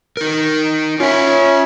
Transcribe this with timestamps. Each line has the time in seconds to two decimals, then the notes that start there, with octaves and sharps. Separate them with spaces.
0.17 D#4 A#4
1.00 C#4 F4 E5